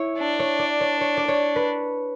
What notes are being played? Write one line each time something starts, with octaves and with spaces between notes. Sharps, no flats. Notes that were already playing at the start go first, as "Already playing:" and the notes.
Already playing: E4 C#5
D4
C#5
D5
C#5
C#5
D5
C#5
B4